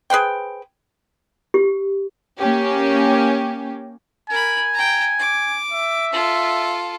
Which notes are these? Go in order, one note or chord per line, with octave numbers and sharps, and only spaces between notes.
G#4 B4 C5 G5
G4
A#3 C#4 G4
A#4 G#5 B5
G5 A#5
D6
E5
F4 A4